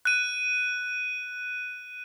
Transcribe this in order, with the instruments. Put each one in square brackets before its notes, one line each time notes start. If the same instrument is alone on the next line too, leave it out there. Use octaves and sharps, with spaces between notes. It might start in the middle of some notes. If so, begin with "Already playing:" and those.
[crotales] F#6 D#7